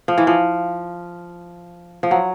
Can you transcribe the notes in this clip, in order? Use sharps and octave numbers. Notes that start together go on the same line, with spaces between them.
F3
E3
F3
F3
F#3